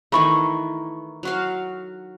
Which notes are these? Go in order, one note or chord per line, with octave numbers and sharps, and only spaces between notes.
D#3 E3 A3 A#5 B5 C#6
F#3 F#4 F5